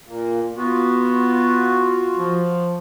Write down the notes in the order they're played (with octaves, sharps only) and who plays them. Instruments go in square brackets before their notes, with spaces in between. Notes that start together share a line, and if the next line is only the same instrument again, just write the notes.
[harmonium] A#2 A#3
[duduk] B3 [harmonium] F4 F#4
[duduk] F3